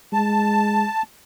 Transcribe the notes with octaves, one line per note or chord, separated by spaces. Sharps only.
G#3 A5